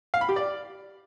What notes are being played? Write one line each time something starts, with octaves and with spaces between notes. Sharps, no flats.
F5
B5
G4
D5